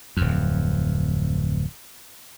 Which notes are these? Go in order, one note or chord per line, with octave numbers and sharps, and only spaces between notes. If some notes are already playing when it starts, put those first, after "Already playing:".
D1 F2